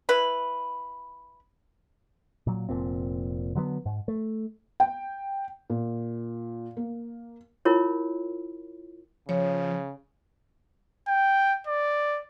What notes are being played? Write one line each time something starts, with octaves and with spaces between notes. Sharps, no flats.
E4 B4
A#2 F#3
F1 A#2 C4
D3 F#3 G3 B3
G#2
A3
G5
A#2
A#3
E4 F4 A#4 C#5
C#3 F3 C#5
G5
D5